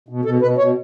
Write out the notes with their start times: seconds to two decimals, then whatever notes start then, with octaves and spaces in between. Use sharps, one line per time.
0.09 B2
0.25 B2 A4
0.42 B2 B4
0.58 B2 C#5